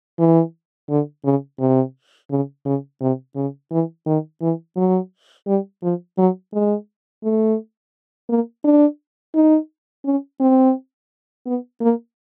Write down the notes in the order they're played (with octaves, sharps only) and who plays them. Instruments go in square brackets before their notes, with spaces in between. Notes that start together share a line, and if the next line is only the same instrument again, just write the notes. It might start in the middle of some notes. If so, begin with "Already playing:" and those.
[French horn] E3
D3
C#3
C3
C#3
C#3
C3
C#3
E3
D#3
E3
F#3
G3
F3
F#3
G#3
A3
A#3
D4
D#4
C#4
C4
B3
A#3